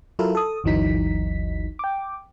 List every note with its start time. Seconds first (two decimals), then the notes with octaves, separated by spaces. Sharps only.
0.19 F#3 E4 F4 A4 A#4
0.35 A4 D#6
0.64 G1 D2 E3 F#3 D#4 B6
1.79 G5 D6